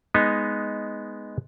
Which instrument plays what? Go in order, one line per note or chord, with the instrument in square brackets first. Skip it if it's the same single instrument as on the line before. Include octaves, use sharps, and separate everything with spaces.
[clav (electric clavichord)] G#3 B3 D#4